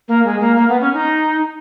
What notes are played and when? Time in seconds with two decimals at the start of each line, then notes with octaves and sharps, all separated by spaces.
0.08 A#3
0.25 G#3
0.41 A#3
0.56 A#3
0.69 B3
0.81 C#4
0.94 D#4